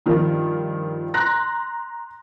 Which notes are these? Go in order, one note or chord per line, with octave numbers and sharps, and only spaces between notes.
G2 D#3 F3
A#5 C6 F#6 A#6